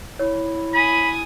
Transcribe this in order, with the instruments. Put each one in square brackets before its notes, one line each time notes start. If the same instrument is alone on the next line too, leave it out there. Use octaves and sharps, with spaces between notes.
[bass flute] E4 [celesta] C#5
[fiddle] G#5 D#6 [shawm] B5